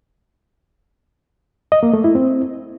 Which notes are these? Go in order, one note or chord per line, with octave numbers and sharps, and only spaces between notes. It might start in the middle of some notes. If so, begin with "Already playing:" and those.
D#5
A#3
A3
E4
C4